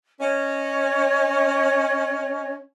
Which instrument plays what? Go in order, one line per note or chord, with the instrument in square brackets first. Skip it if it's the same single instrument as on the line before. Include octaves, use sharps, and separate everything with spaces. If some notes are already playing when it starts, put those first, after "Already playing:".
[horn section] C#4 [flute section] C#5 D#5